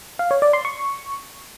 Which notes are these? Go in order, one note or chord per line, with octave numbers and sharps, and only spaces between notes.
F5
C#5
D5
C6
C#6